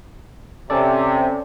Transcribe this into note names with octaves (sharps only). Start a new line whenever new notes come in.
C3 C#4 A4 D5